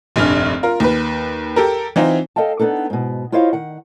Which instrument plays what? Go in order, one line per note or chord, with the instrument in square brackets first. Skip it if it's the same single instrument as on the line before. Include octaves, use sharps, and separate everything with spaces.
[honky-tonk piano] F1 A#1 G2 F6
F4 A#4
D#2 B4
G4 A4 A#4
E3 C4 D#4 F4
[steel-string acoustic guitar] A4 D#5 F5 G5 A5
B3 D4 D#4 A4
G#2 B2
E4 F4 C5 C#5 D#5 F5
D#3 F#5